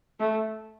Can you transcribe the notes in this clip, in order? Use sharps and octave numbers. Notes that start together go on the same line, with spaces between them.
A3